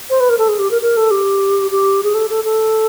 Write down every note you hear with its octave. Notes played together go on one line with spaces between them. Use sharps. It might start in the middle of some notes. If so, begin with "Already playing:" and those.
C5
B4
A#4
A4
G#4
G4
A#4
A#4
A4
G4
G4
G#4
A4
A4
A4